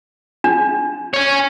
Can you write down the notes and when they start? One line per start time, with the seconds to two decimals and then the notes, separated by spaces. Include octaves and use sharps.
0.44 D4
1.14 C#5 G#5